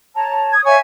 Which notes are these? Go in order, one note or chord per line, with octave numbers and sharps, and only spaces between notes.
C#5 A5 A#5
D#6 G#6
C#5 E5 F5 G#5